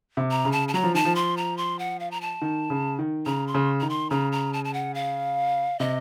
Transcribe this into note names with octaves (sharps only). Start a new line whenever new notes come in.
C3
A#5
C#3
A5
A5
F#3 A#5
F3
D#3 A5
F3
C6
A#5
C6
F#5
F5
A#5
A5
D#3
C#3
D#3
C#3 A#5
C6
C#3
D#3 A#5
C6
C#3 A#5
A#5
A5
A5
F#5
F5
C3 D#5